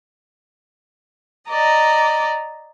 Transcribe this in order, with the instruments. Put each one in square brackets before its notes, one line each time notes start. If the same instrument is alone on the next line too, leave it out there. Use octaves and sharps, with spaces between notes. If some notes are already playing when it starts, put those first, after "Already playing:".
[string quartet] D5 D#5 A#5